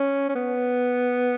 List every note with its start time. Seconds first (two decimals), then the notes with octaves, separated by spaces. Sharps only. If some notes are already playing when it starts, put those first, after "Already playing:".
Already playing: C#4
0.29 C#4
0.35 B3